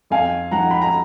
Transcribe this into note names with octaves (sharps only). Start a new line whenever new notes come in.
F2 F5 G#5
F3 F#5 A#5
B5
A#5